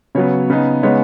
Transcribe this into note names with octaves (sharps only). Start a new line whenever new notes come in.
C#3 F#3 B3 C#5
C#3 B3 D#4
C#3 G#3 B3 D#4 C#5